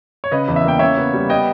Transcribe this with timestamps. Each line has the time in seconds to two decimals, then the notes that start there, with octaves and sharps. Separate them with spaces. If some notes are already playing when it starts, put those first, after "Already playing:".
0.24 C#5
0.31 C#3 B4 D#5
0.48 E2
0.56 E5
0.65 A#3 G5
0.79 C#3 C#5 E5
0.97 B3
1.14 G3
1.29 B3 D#5 G5